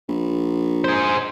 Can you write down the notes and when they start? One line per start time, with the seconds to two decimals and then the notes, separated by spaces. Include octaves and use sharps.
0.08 A#1
0.84 G#4 C5